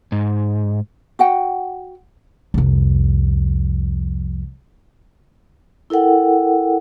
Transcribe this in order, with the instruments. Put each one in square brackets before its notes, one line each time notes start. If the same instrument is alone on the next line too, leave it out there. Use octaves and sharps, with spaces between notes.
[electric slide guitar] G#2
[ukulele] F#4 F#5 G5
[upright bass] C2 F2
[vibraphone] E4 A4 A#4 F#5 G5